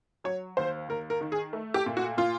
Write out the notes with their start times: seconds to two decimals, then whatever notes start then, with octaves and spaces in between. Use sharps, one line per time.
0.24 F#3 C#5
0.57 D#2 C5
0.89 D#2 A#4
1.10 A#4
1.21 D#3
1.32 G#4
1.53 A3
1.74 G4
1.86 A#2
1.97 F#4
2.17 A#2 F4